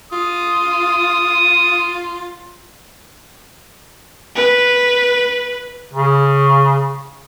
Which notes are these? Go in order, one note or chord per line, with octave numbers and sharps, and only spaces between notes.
F4 D#6
B4
C#3